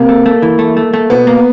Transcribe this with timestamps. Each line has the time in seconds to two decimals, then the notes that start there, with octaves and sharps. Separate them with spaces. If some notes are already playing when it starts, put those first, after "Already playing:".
Already playing: C3 A#3
0.09 A3
0.26 A3
0.42 E3
0.59 A3
0.77 A3
0.94 A3
1.10 B2 B3
1.27 A#3